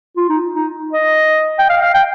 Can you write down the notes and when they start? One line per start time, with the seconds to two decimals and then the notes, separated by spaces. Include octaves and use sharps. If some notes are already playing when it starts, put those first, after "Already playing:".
0.17 F4
0.29 D#4
0.55 D#4
0.93 D#5
1.59 G5
1.69 F5
1.82 F5
1.94 G5